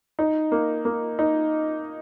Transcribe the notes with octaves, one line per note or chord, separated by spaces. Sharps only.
D#4
A#3
A#3
D#4